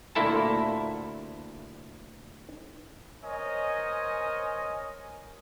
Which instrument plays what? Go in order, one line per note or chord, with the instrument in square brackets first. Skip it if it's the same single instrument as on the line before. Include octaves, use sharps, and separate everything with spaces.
[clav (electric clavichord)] D2 A#2 A#3 E4 A4 A5
[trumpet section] A#4 C5 C#5 D#5 G#5